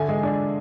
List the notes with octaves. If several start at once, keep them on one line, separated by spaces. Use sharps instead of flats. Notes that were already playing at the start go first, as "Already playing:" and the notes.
Already playing: D3 E5 G#5
G#3
D4